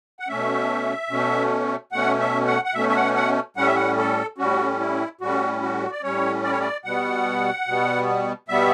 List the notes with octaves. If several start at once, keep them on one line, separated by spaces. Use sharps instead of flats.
F#5
B2 A3 C#4 E5
B2 A3 C#4
B2 A3 C#4 F#5
E5
F#5
F#5
B2 A3 C#4 E5
E5
F#5
F#5
A2 G3 C#4 F#5
E5
F#5
A4
A2 G3 C#4 F#4
E4
A2 G3 C#4 F#4
F#4
D5
A2 G3 C#4 C#5
D5
C#5
D5
B2 G3 B3 F#5
B2 G3 B3
B2 G3 B3 E5